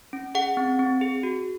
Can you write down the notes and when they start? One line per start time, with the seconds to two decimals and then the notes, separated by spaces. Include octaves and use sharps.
0.13 C#4
0.35 G#4 F#5
0.57 C4
0.79 C4
1.01 G#4
1.23 F#4